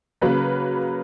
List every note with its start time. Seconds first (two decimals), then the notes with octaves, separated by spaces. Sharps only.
0.21 C#3 F#3 A#3 B4